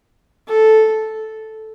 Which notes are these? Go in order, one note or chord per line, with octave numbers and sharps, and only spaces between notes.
A4